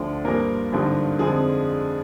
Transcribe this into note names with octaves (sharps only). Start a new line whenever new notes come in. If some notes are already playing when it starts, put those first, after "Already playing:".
Already playing: D2 D3 F3
G2 F3 A#3 A#4
G#1 G2 D3 F3
F2 D3 F3 G#3 G#4